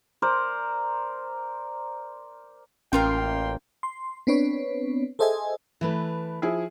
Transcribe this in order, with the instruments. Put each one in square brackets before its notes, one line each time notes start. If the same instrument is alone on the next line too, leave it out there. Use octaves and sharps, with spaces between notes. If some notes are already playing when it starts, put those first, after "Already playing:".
[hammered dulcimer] A#4 C5 D5
[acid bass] A1 [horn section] A#3 G5 C6 [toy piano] C#4 [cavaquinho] F4 A#4 F5
[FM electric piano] C6
B3 C4 D4 B4 C#5
G#4 A4 C5 D#5 E5 G#5
[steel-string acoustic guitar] E3 A3 B4
[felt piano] F3 E4 G#4